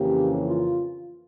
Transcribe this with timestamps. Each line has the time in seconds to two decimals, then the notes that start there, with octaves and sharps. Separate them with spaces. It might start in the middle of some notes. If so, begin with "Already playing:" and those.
Already playing: F2 C#3 E3 A#3 C#4 G4
0.46 F4